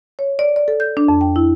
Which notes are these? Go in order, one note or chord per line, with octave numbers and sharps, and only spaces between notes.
C#5
D5
D5
A4
G6
D4
F2
G5
E4